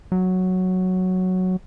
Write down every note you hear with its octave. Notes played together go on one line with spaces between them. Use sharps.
F#3